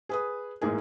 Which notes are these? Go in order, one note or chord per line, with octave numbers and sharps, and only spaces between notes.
G#4 B4 D#6
A1 G#2 A#3 G#4